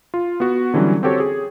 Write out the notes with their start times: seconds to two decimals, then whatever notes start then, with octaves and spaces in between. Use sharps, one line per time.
0.14 F4
0.40 B3 F#4
0.74 D3 E3 F#3 G3 C#4
1.03 C4 F#4 G4 A4 C#5
1.20 G#4